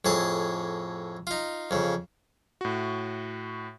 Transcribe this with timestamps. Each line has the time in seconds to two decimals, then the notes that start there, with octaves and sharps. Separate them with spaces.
0.05 F2 A2 G#4 A5
1.27 D#4 F4
1.71 F2 C#3
2.61 A2 F#4